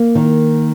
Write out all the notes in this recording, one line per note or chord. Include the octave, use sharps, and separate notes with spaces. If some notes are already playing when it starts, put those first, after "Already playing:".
Already playing: A#3
D#3